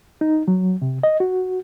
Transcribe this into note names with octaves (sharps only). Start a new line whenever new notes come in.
D#4
F#3
C3
D#5
F#4